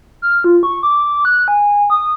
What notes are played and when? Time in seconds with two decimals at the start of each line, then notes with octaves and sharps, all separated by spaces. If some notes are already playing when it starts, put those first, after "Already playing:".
0.22 F6
0.44 F4
0.63 C#6
0.83 D6
1.25 F#6
1.48 G#5
1.90 D#6